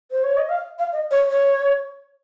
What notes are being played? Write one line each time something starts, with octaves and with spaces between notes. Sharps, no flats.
C5
C#5
D#5
F5
F5
D#5
C#5
C#5